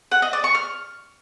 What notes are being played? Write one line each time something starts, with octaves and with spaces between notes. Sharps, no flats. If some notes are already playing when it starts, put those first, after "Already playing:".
F#5
D#5
D5
C#6
F6